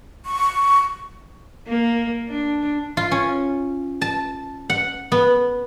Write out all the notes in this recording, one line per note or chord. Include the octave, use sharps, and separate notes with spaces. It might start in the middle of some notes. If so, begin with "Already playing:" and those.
C#6
A#3
D4
F4
C#4
A5
F#5
B3